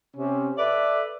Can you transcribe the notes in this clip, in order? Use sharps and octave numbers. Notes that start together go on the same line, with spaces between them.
C3 C#4
A4 B4 D5 E5